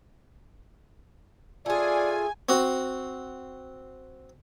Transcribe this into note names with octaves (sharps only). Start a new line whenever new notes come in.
A3 F4 G#4 D5 G#5
C4 F#4